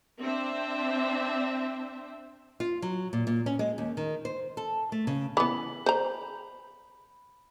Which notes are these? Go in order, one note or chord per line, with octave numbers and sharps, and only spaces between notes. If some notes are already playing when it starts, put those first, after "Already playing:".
C4 D4 C5 E5
F4
F#3
A#2
A#2
C#4
G#3
D#2
D#3
C5
A4
A3
C#3
E3 B3 B5
C5 A#5